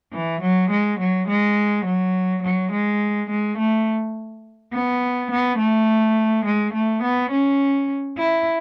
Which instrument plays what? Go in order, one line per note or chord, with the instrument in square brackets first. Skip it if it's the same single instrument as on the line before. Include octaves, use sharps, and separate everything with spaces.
[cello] E3
F#3
G#3
F#3
G#3
F#3
F#3
G#3
G#3
A3
B3
B3
A3
G#3
A3
B3
C#4
E4